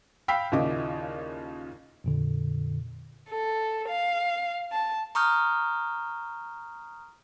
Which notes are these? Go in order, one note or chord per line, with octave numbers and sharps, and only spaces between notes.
F5 G5 B5 E6 B6
D#2 A#2 C#3 E4 D#5 D6
F2 A#2 D3
A4
F5
A5
A#5 C#6 D#6 F6 G6